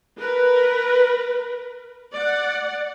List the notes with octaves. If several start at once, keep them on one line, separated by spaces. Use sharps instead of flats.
A#4 B4
D5 F#5